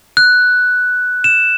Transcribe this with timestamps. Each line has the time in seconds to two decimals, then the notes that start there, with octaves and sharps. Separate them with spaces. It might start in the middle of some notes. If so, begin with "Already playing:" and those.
0.17 F#6
1.24 E7